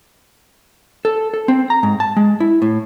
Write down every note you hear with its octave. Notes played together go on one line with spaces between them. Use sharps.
A4
A4
C4
A#5
G#2
A5
G#3
E4
A2